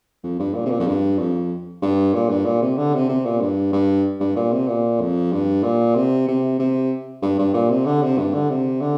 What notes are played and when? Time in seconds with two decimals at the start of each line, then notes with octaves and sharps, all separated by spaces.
0.23 F2
0.39 G2
0.54 A#2
0.65 C3
0.70 A#2
0.80 F2
0.87 G2
1.19 F2
1.82 G2
2.14 A#2
2.29 G2
2.45 A#2
2.62 C3
2.77 D3
2.94 C3
3.09 C3
3.25 A#2
3.41 G2
3.73 G2
4.20 G2
4.36 A#2
4.52 C3
4.68 A#2
5.00 F2
5.32 G2
5.63 A#2
5.95 C3
6.28 C3
6.59 C3
7.22 G2
7.39 G2
7.54 A#2
7.70 C3
7.85 D3
8.02 C3
8.18 G2
8.34 D3
8.50 C3
8.81 D3